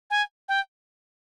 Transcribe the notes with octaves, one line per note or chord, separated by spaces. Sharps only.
G#5
G5